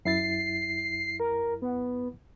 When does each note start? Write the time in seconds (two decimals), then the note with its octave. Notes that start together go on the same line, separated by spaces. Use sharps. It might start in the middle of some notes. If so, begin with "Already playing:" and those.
0.05 F#2 E4 A6 C7
1.20 A#4
1.62 B3